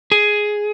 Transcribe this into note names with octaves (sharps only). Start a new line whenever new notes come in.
G#4